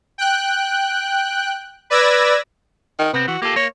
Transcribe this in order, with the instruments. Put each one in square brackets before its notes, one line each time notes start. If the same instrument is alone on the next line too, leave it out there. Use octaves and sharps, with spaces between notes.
[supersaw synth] G5 F#6
B4 D5 E6 G#6 A#6
[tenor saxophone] D#3
[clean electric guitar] C3 C4 [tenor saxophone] B3
[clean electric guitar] E3 [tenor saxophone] F#4
[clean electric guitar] A#3 F4 A4 [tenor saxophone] G4
[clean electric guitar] A#3 [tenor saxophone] C#5